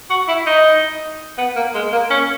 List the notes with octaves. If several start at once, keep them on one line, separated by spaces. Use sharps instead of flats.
F#4
E4
D#4
B3
A#3
G#3
A#3
C#4